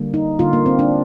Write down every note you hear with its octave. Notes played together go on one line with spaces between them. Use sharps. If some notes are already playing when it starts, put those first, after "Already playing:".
Already playing: D3 G3 A#3
D#4
D3 G3 A#3 F4
A#3
C4
D4